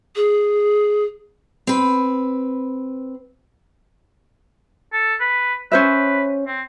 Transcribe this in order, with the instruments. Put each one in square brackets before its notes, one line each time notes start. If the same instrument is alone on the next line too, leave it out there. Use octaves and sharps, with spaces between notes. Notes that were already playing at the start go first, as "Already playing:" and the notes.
[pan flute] G#4
[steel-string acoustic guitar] C4 B4
[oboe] A4
B4
[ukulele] C#4 C5 E5 [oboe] B4
[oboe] C4